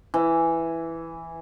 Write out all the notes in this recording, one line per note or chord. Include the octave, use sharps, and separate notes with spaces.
E3